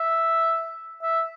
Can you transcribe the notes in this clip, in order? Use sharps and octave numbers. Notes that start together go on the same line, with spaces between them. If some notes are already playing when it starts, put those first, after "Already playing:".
Already playing: E5
E5